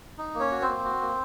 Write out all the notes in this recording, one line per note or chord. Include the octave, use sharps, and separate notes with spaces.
D#4
A#3
C#4 C#5
F#4
C4 C5
A#3
F#4
A#3